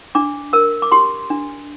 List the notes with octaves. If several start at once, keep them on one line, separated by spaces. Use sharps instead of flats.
D4 D6
A#4 E6
D6
G4 C6
D4